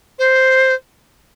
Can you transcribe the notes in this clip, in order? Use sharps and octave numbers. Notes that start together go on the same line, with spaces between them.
C5